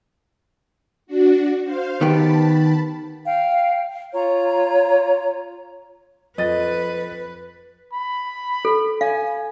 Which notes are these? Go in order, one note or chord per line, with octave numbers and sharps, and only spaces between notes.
D4 F#4
C5 F5
D#3 B3 G4 A5 B5
F5 G5
F4 C#5 A#5
F2 B4 D#5 A6
B5
A4
F5 G#5